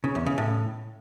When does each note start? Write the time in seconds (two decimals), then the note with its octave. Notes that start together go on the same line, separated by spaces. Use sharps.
0.04 C#3
0.15 E2
0.26 C#3
0.38 A2